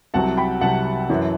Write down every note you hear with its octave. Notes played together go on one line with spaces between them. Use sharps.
C2 C3 F#3 F#5 A5
G5 B5
C2 C3 F#3 F#5 A5
F#2 E3